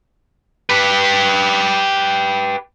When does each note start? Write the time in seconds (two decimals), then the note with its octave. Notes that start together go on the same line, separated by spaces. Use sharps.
0.70 G4 B4